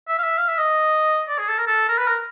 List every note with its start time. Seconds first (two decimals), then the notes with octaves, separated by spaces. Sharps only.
0.08 E5
0.18 F5
0.23 E5
0.38 F5
0.48 E5
0.58 D#5
1.28 D5
1.39 G#4
1.48 A4
1.58 A#4
1.67 A4
1.89 A#4
1.98 B4
2.07 A#4